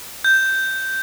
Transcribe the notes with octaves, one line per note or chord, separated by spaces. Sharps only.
G6